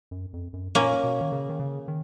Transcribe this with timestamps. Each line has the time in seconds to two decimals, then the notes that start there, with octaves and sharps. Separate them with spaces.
0.11 F#2
0.33 F2
0.53 F#2
0.75 A#2 A#3 C#4
1.03 B2
1.21 D#3
1.32 C#3
1.49 D#3
1.59 C#3
1.88 D#3